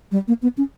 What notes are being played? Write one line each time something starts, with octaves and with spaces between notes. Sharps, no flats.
G3
A#3
B3
C#4